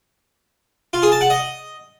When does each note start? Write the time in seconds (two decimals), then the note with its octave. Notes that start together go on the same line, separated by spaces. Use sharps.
0.93 F4
1.03 G#4
1.12 A5
1.21 F#5
1.30 D#5